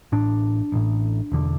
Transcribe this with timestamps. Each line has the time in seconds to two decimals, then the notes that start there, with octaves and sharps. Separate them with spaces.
0.12 A1 A2 D4
0.72 A1 A2
1.32 E1 E2 D3